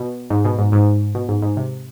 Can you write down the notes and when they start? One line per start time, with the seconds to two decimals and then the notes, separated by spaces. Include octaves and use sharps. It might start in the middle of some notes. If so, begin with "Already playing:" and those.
Already playing: B2
0.30 G#2
0.45 B2
0.58 G#2
0.72 G#2
1.15 B2
1.29 G#2
1.42 G#2
1.57 C3